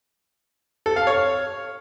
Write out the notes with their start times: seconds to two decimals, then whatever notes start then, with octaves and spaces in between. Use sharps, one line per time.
0.86 A4
0.96 F5
1.07 C#5